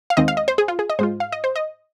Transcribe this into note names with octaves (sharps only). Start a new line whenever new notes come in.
F5
D#2 D#3 G#3 C4 D#4 D#5
F5
D#5
C5
G#4
F4
G#4
D#5
G#2 G#3 F4 C5
F5
D#5
C5
D#5